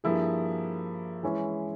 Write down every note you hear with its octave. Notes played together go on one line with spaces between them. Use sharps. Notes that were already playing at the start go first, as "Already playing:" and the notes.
G2 F3 A#3 E4 G#4
E3 G#3 C#4 E4